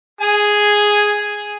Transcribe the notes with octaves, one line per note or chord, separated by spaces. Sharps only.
G#4 G#5